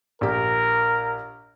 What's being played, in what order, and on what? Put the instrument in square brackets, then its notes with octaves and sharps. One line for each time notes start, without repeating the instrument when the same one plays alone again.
[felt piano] A#1 G4 [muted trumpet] A#4